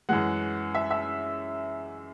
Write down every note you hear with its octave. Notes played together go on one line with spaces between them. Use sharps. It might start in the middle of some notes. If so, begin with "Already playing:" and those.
F#2 E3 G#3 F#5
E5
E5